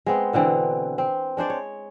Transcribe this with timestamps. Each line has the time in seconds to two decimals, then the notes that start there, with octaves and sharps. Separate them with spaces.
0.06 G#3 B3 C4
0.33 B2 D3 E3 C4
0.98 C4
1.37 G#3 D4 C5 D5
1.50 C#5